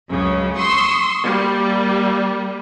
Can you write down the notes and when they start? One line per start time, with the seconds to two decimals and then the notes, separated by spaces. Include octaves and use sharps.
0.11 C#2 F#2 C#3
0.58 C6 C#6 D#6 E6
1.25 G3 A#3